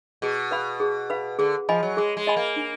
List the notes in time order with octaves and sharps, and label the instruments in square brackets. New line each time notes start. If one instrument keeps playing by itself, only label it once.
[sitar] B2 [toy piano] G#4
[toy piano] B4 F5 B5
G#4
B4 F5 B5
[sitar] D3 [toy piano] G#4
[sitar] F3 [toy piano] D#5 G#5 B5
[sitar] F#3
[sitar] G#3 [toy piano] G#4
[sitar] G#3
[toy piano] D#5 G#5 B5
[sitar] A#3
[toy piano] D4